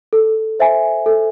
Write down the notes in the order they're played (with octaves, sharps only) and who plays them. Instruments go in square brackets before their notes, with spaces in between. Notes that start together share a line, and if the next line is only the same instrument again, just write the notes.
[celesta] A4
C5 E5 G#5
A4